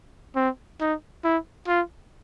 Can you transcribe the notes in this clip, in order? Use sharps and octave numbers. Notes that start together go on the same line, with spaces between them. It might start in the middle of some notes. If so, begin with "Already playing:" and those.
C4
D#4
E4
F4